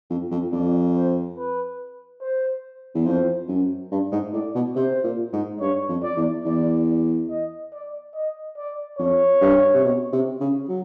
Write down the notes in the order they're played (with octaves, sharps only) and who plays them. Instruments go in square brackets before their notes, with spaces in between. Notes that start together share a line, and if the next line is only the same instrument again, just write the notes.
[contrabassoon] F2
F2
[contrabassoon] F2 [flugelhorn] D5
[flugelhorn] C5
B4
C5
[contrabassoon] E2
[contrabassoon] F2 [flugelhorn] C5
[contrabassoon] F#2
G2
G#2
[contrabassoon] A2 [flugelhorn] D5
[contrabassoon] B2
[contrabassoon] C3 [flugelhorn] C5
[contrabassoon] A#2
G#2
[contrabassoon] G2 [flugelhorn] C#5
[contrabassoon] F2
[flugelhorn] D5
[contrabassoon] E2
[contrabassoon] E2 [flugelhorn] D5
[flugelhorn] D#5
D5
D#5
D5
[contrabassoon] F2 [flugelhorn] C#5
[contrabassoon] G2
C3
B2
C3
C#3
F#3